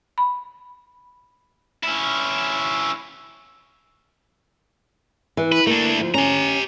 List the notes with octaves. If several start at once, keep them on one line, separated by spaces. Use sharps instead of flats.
B5
C#4 E4
E3
B4
A3 A#3 D4
D2 F3
C#4 G4 A#5